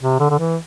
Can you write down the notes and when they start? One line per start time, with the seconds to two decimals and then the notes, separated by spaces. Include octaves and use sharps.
0.01 C3
0.20 D3
0.30 D3
0.39 E3